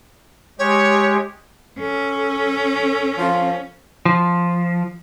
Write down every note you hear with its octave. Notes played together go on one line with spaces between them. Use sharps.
G#3 G4 C#5
C#4 A4
F3
F3